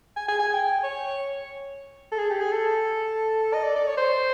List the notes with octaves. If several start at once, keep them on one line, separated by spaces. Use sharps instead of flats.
G#5
G#5
G#5
G5
C#5
A4
G#4
G4
G#4
A4
D#5
D5
D5
C#5
C5